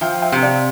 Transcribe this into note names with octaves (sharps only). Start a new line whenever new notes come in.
F3 E5 G5
E5 G5
C3
D5 F5